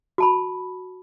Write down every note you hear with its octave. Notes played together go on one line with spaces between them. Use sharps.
F#4 A5 B5